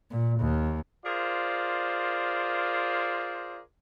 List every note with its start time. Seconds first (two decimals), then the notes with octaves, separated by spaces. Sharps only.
0.11 A#2
0.40 D#2
1.05 F4 G#4 A#4 C5 D5